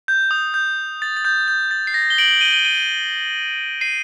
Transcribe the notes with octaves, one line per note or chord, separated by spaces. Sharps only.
G6
D#6
G6
A6
A6
G6
G6
A6
C7
A#6
G7
D7 F#7
D#7 G7
D#7 G7
D#7 G7
C7 D#7